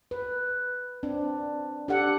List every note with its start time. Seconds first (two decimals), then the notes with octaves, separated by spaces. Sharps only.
0.11 B4
1.03 C4 D4
1.88 D4 G4 A4 F#5